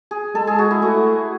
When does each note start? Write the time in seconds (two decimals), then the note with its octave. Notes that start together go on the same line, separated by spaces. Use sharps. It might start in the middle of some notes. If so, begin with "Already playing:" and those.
0.11 G#4
0.35 G#3 A4
0.47 G#4
0.59 F#4
0.71 E4
0.82 A3 F#4